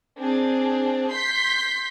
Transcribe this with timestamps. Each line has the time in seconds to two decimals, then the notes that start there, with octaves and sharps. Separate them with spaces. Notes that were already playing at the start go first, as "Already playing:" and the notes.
0.18 C4 D4 G#4
1.12 C6 G6 B6